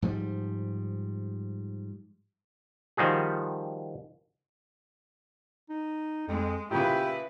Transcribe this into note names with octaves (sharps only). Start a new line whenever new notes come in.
G#2 F3 G3
D#3 F3 G3 F#4 G#4
D#4
F2 G#3
A#2 C#3 E4 G4 B4